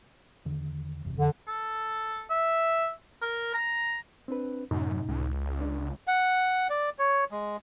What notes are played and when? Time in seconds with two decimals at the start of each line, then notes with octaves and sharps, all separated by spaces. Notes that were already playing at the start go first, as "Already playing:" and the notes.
0.45 E2 D3 D#3
1.04 F#1 E2 C3
1.19 F2 D3
1.48 A4
2.30 E5
3.22 A#4
3.54 A#5
4.28 C4 D4 B4
4.71 F#2 A2 C3 D#4
5.09 C#2
5.61 D4
6.07 F#5
6.70 D5
6.99 C#5
7.31 G#3